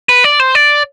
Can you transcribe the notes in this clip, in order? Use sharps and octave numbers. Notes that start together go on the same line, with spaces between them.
B4
D5
C5
D5